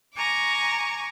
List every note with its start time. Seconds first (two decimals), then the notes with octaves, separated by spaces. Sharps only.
0.14 G#5 A#5 C#6 D6